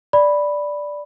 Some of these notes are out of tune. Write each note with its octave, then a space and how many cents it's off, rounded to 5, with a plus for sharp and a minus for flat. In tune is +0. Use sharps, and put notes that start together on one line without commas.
D5 +0 B5 +0